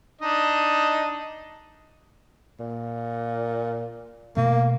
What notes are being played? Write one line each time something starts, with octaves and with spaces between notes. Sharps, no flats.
D4 D#4 D#5
A#2
B2 A3 A#3